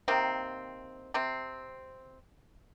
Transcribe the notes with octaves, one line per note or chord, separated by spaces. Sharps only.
C3 D#3 A#3 C4
C3 C4